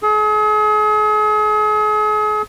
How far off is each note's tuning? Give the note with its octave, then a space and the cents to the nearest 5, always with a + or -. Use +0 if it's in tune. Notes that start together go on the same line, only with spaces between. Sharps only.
G#4 +40